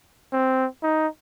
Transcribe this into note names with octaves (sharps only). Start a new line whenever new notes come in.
C4
D#4